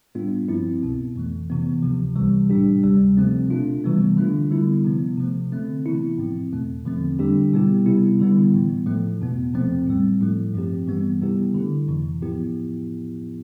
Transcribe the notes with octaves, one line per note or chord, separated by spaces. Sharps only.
A2 G3 B3 D4 F4
G2 F3 C4 E4
C2 B2 B3
F2 E3 A3
C3 E3 B3
D2 C3 F3
C2 C3 E3 G3
A2 G3 D4 G4
D2 C3 G3
C3 F3 A3 C4
B2 A3 D4 F4
C3 E3 G3 B3
D3 A3 D4 F4
D3 G3 B3 E4
C3 F3 B3
C3 F3 A3
D3 A3 C4
C3 E3 B3 E4
A2 F3 C4
E2 B2 A3
E2 D3 F3 A3 C4
D3 G3 D4 G4
B2 G3 B3 E4 G4
C3 G3 B3 E4
D3 G3 B3 E4
A2 E3 B3
A2 F3 A3
E2 B2 B3
E2 C3 F3 A3 C4
A2 G3 C4
A2 F3 A3
G2 F3 C4 G4
G2 E3 G3 B3
C3 G3 B3 E4 G4
D3 A3 E4
F2 C3 E3
A2 F3 B3 E4 G4